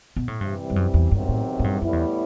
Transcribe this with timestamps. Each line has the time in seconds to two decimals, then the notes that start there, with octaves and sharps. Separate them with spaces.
0.16 B2
0.28 A2
0.40 G2 C3 E3 G3
0.70 G2
0.76 F#2
0.94 E2
1.11 E2 G2 C3 D#3 F#3 C4
1.29 A2
1.60 A2
1.64 G2
1.81 F#2 A2 G3 B3 E4
1.93 E2